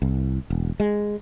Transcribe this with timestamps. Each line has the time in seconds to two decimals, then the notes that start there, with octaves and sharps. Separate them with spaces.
0.02 C2
0.50 E1
0.80 G#3